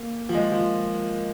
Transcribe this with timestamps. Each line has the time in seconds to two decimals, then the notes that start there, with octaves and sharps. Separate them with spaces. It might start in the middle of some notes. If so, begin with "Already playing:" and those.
Already playing: A#3
0.29 F3
0.34 G#3
0.52 F3